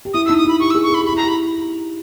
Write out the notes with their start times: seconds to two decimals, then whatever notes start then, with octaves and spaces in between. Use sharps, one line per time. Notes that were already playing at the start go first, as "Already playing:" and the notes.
0.05 G4
0.14 E4 D#6
0.26 E6
0.30 D#4
0.37 D#6
0.45 E4 B5
0.60 G4 C#6
0.70 E6
0.75 G#4
0.83 C#6
0.90 G#4 B5
1.01 G4 B5
1.12 E4 A#5
1.23 G4
1.28 B5